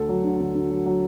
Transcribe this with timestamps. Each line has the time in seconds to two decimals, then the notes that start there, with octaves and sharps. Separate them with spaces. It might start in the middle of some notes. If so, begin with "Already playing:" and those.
Already playing: D2 D3 A4
0.09 F#3
0.24 D3
0.40 D2
0.55 D3
0.70 F#3
0.86 F#3